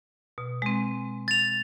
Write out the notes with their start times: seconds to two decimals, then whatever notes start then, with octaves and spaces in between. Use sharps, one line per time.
0.38 B2
0.62 G#3 C4
1.28 A6 F7